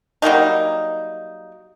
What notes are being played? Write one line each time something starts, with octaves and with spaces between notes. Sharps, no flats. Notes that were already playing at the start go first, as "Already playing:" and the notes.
F#3 G3 A#3 D#4